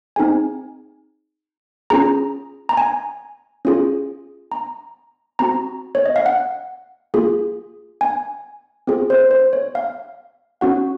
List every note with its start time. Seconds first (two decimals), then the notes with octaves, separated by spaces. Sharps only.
0.16 C4 D#4 G#4 G#5
1.90 C#4 F4 G#4 A#5
2.69 A#5
2.77 G#5
3.65 C#4 F4 G#4
4.52 A#5
5.39 C4 F#4 A#5
5.95 C#5
6.06 D#5
6.16 F5
6.26 F#5
7.14 A#3 F4 G#4
8.01 G#5
8.87 C4 F4 G#4
9.10 C5
9.31 C5
9.53 C#5
9.75 F5
10.61 C#4 F#4 F#5